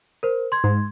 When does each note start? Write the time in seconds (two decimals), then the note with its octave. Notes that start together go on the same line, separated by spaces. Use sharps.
0.23 A#4 C5
0.52 C6 G#6
0.64 G#2